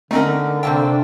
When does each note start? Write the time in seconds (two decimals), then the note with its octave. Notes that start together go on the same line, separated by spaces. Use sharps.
0.11 D3 A3 C4 C#4 D#4 A#4
0.63 C3 A3 A#3 C4 D4 G5